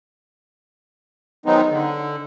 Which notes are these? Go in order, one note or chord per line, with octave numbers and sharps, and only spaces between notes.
D#3 F#3 G#3 B3 C4 D#4
D3